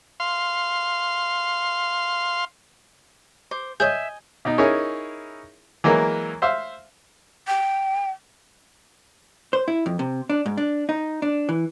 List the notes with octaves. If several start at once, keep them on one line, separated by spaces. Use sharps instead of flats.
F5 C6
C5 D6
G#4 C5 C#5 D#5 E5 G#5 G6
B2 D#4
C#4 D#4 E4 G#4 A#4 C#5
E3 F#3 G#3 A#3 A#4
C5 E5 F5
G5
C5
E4
F2
C3
D4
G#2
D4
D#4
D4
E3